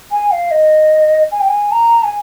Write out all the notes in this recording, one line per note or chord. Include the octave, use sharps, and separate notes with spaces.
G#5
F5
D#5
G#5
G5
G#5
A#5
G#5